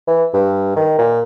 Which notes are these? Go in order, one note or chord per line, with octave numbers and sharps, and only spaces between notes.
E3
G2
D#3
A#2